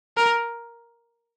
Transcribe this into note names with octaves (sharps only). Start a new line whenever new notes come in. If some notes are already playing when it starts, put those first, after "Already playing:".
A#4